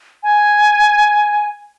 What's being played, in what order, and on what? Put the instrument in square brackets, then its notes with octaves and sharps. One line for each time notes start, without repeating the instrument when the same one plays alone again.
[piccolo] G#5